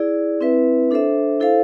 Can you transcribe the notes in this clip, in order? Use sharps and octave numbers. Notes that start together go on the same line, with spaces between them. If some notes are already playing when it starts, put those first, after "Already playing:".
Already playing: E4 G#4 D5
C4 E4 B4 E5
D4 A4 C5 E5
E4 A4 C5 F5